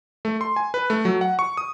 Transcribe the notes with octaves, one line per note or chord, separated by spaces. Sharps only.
A3
C6
G#5
B4
A3
F#3
F#5
C#6
D#6